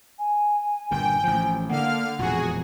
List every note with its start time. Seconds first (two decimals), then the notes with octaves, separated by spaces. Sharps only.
0.19 G#5
0.91 G1 G2 A#2 G5
1.23 A1 F3
1.69 D3 A#3 F5 F#5 F6
2.19 E1 F2 A#2 F#4 G#4